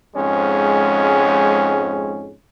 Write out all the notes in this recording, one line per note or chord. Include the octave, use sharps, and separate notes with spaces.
F2 G#2 G#3 C#4